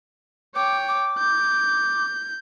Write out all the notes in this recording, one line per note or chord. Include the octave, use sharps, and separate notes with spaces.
C#5 G5 D6
D6
G6